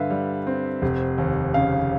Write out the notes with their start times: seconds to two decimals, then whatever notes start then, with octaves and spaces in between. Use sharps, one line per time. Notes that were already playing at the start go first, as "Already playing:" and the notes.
Already playing: G2 D3 B4 E5 F5
0.10 G3
0.47 C4
0.82 F1
1.18 D#2
1.54 C#3 F5